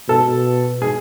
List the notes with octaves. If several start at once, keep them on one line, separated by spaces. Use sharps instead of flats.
B2 A4
G#4